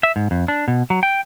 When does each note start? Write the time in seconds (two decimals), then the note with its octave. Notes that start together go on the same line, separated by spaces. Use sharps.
0.03 E5
0.16 G#2
0.31 F2
0.48 D4
0.68 B2
0.90 F#3
1.03 G5